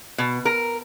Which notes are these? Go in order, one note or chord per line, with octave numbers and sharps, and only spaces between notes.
B2
A#4